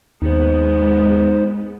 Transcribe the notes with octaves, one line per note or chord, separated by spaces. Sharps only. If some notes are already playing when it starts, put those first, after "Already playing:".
D#2 G#2 G#3 B3 D#4 C5